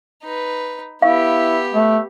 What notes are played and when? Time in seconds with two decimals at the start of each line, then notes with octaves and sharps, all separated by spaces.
0.23 D#4 B4
1.02 B3 E4 G4 F5
1.74 A3